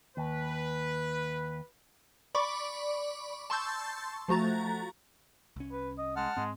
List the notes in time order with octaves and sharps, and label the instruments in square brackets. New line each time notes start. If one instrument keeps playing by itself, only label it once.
[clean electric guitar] D#2 [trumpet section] B4
[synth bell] D5 B5 C#6 D6
A5 C6 C#6 E6 G6 A6
F3 A3 F#4 A#5 A6
[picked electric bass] C2 C#4
[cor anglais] B4
D#5
[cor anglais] G#3 [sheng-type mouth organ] F#5 A5 F6
[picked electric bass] G#2 C4 [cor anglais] G#3